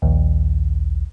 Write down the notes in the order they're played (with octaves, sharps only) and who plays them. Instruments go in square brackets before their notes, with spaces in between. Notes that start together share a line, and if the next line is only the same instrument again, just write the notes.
[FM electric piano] A#1 D#2